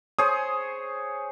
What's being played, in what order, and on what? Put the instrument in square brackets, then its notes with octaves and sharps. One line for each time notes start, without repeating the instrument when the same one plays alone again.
[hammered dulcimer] G#4 C5 C#5 [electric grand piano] D#6